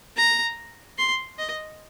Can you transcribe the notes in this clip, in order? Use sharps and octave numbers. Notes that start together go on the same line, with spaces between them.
A#5
C6
D#5